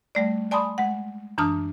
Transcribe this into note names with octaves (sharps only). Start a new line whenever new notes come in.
G3 A3 D5
D5 G#5 A5 B5 C6 D#6
G#3 F#5
F#2 E3 D4 A5 D#6 F6